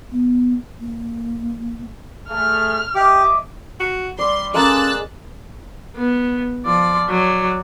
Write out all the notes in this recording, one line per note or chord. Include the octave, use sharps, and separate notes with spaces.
B3
A#3
A3 G#4 F6
G4 D#5 E5 D6
F#4
G3 D5 C6
G#3 A#3 C#4 G#4 A4 E6 F#6 A6
B3
F3 D5
F#3 D5